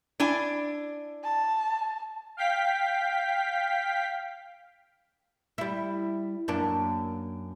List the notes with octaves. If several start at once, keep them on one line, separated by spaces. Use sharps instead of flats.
D4 E4 G#5
A5
F5 G5 B6
G3 E4
F#2 A#3 D4